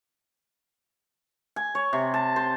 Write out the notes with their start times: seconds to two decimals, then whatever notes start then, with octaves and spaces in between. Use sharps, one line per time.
1.56 G#5
1.75 C#5
1.93 C3
2.14 A5
2.36 C5